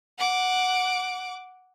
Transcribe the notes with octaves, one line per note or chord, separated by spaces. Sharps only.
F#5 D6